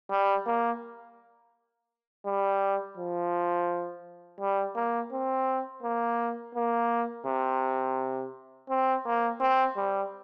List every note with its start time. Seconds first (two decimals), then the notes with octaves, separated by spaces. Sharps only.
0.10 G3
0.46 A#3
2.26 G3
2.97 F3
4.40 G3
4.75 A#3
5.12 C4
5.83 A#3
6.55 A#3
7.27 C3
8.70 C4
9.06 A#3
9.41 C4
9.77 G3